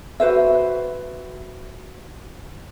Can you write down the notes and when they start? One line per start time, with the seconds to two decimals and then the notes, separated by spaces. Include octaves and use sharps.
0.20 F#4 B4 C5 E5